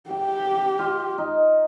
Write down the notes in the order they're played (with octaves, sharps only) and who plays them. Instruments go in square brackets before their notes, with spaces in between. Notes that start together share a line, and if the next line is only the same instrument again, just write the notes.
[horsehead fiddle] G4 [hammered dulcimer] G5
[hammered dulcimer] F4
D#4